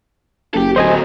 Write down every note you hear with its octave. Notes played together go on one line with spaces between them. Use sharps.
F#1 G4 A4
D1 F#3 A3 C5 D#5 G#5